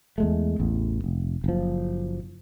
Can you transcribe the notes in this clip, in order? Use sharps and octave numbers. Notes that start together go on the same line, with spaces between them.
E2 G#3 A3
A1 E2
F1
F#1 F3